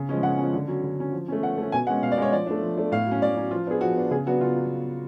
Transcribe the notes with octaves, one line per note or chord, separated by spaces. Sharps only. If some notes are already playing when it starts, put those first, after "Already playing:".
Already playing: C#3
F3 G#3 C#4
C#3 F#5
F3 G#3 C#4
D3
F#3 C#4
D3
F#3 C#4
F3
A3 C#4
F3 F#5
A3 C#4
B2 G#5
G#3 C#4 F#5
B2 F5
D5
G#3 C#4 C#5
F3 D5
A3 D4
F3
A3 D4
A2 F5
F#3
C#4
A2 D5
F#3 C#4
F3 F4
B3 D4 G#4
F3 F#4
B3 D4
C#3 G#4
F#3 B3 D4 F#4
C#3 F4
F#3